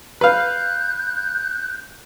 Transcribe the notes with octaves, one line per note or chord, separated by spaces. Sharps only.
B4 F5 F#6 G6